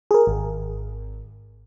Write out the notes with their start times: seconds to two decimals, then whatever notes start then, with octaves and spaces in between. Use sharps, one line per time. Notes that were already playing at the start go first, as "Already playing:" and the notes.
0.11 G#4 A#4
0.27 G#1